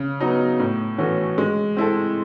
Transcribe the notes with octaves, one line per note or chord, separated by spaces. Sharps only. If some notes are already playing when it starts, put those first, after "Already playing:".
Already playing: C#3
F#3 B3 D#4
A2
E3 A3 C#4 F#4
G#3
C4 E4 A4